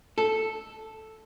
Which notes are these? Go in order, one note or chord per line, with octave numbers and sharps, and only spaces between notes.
A4